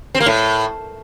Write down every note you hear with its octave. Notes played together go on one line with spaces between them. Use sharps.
C4
A#3
A2